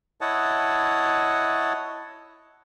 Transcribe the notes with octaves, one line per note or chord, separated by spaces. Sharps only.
E4 C#5 D#5 F#5 A5